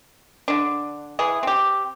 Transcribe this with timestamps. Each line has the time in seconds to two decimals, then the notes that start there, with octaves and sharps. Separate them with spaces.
0.48 D3 D4
1.19 E3 G#4
1.43 C4 G4